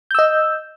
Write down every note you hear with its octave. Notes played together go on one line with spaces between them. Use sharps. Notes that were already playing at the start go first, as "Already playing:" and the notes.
D#5 E6 G6